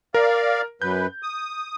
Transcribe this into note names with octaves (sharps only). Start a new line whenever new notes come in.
A#4 D5 F5
F#2 B4 G6
D#6